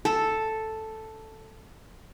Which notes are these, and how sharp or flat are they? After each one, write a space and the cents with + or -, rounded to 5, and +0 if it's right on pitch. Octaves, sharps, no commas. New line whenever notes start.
A4 +0